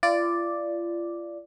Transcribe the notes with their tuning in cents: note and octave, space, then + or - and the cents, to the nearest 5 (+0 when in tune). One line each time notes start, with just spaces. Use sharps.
F4 -35 D5 +0